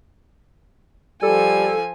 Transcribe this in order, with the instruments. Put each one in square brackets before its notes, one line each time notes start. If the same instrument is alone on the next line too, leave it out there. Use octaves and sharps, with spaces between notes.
[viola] F3 G#5 [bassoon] G3 [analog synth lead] A4